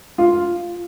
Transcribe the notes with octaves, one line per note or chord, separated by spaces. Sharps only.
F4